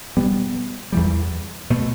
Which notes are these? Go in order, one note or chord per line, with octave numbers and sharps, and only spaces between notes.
B2 G3 B3
E2 E3 G3
B2 A3